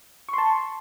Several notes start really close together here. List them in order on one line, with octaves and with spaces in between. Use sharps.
C#6 C6 A5